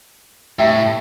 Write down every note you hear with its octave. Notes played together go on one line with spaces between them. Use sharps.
A2 E5 G5